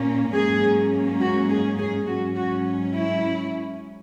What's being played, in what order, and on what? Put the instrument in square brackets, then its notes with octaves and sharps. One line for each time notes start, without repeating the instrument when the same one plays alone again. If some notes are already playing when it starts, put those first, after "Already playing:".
Already playing: [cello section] A#2 A#3 C#4
G#2 F#3 A#3 C#4 G#4
F#4
G#4
G#4
G#2 F#3 C#4 F#4
F#4
E4